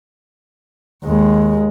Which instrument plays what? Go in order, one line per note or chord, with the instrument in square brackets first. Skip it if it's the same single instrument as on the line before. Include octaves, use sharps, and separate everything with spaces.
[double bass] D#2 G#3